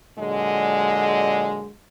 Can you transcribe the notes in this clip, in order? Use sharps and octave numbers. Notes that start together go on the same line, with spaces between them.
A#2 D3 F#3 G#3